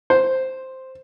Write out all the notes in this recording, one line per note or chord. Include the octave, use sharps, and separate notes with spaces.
C5